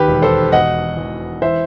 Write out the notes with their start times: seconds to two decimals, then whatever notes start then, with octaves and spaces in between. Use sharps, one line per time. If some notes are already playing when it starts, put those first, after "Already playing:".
Already playing: D#2 G4 B4
0.08 E1
0.22 A4 C5
0.52 B2 D#5 F#5
0.97 E2
1.42 E3 C5 E5